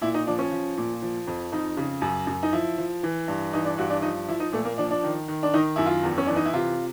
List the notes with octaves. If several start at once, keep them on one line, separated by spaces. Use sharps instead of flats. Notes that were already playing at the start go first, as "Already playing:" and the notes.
A#2 E4
D#4
F3 D4
C#4
F3
A#2
F3
F2
F2 D#4
C#3
F#2
F#2
D#4
F3 E4
F3
E3
G2
E3 D#4
D4
G2 F#4
D4
F3 D#4
F3 E4
D#4
A#2 A3
A#3
F3 D4
D4
D#3
D#3
D4
D#3 D#4
F#2 E4
F4
E2
C#4
E3 D4
D#4
E4
C3 F4